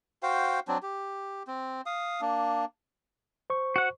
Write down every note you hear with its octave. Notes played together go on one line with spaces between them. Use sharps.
F#4 C5 F5 G5
F#3 C4 D4
G4
C4
F5 D#6
A#3 D4
C5 C#6
F#4 F#5